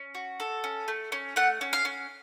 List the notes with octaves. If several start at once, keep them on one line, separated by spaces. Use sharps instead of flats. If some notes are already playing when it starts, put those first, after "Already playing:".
Already playing: C#4
F#4
A4
C#4
A3
C#4
A3 F#5
C#4
F5
C#4